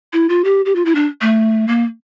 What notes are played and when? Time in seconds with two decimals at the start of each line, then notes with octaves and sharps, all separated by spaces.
0.13 E4
0.29 F4
0.44 G4
0.65 G4
0.75 F4
0.85 E4
0.95 D4
1.21 A3
1.68 A#3